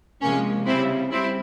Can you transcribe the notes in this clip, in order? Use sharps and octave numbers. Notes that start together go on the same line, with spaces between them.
C3 F3 G#3 A#3 C#4
C#3 G3 C4 E4
G3 C4 E4